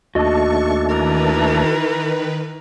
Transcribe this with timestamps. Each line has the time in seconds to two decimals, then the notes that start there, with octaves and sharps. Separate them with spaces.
0.15 D#2 A3 D4 F#4 D#5 C#6
0.89 D#3 E3 A#4 B4